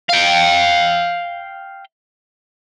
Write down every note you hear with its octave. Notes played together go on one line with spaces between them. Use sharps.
F5 G5